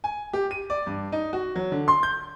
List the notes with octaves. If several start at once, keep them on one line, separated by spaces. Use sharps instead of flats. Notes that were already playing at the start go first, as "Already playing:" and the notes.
G#5
G4
D#7
D5
G2
D#4
F#4
F#3
D3
C6
G6